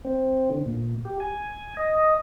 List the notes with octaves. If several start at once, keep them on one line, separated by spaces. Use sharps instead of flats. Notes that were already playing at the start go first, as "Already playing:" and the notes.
C4
D3
A#2
G4
G#5
D#5